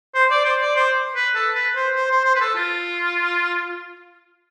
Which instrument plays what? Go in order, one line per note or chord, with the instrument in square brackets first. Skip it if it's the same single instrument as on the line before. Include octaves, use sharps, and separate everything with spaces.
[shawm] C5
D5
C5
D5
C5
B4
A4
B4
C5
C5
C5
C5
B4
A4
F4